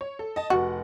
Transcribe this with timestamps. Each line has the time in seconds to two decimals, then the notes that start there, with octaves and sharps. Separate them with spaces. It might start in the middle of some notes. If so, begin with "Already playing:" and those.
0.01 C#5
0.19 A4
0.36 D#5 A5
0.50 F1 F#4 F#5